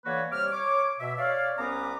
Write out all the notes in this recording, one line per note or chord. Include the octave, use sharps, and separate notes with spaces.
D3 E3 A#3 F#4 B4 C#5
C3 G3 C#5 D6 F6
C#5 D6
B2 E5
C#5 D5 F5
C2 B3 C#4 B4 A#5 D6